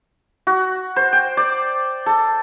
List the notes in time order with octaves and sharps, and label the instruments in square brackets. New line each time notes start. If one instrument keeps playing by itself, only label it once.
[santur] F#4
C5
G5
D5
A4